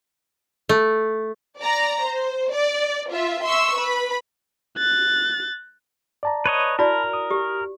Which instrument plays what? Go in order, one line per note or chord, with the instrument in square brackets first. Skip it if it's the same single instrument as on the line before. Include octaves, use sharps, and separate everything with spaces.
[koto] A3
[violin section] D5 A#5
C5
D5
F4 E5
E5 C6 C#6 E6
B4 B5
[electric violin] F#6 A6
[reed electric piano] D5 A5 A#5
[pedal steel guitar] B4 C#5 D#5
[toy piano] E4 F#4 D5 [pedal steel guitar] A#4 [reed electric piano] A5 B5
[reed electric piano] D#6
[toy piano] G4